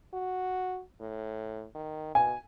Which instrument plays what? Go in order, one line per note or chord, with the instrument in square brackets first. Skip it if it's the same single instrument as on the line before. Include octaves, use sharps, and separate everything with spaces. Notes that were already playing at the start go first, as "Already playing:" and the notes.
[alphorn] F#4
A2
D#3
[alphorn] B2 [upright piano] G#5